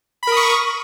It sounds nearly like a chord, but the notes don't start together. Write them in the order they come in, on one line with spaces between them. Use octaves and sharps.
B5 A#4 D#6 C#6